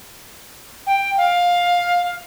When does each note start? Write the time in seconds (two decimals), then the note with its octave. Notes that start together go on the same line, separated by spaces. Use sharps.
0.87 G5
1.17 F5